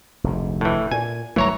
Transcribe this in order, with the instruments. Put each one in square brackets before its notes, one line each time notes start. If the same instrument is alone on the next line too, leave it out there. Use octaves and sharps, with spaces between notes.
[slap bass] F1 D2 G#2
[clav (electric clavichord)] A2 E3
[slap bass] A#2 [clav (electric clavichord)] G#5
[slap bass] G1 F#3 A3 [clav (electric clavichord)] E3 C#5 A#5